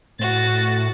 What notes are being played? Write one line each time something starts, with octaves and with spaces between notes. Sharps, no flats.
A2 F#4 A6